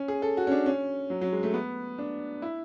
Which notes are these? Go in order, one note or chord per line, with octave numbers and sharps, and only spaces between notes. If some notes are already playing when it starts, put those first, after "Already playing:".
Already playing: C#4
G#4
A4
F#4
C#4
D4
C#4
F#3
F#3
G#3
A3
B3
D4
E4